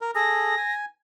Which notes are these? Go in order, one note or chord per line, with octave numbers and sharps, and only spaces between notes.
A#4
G#4 A4 A#6
G#5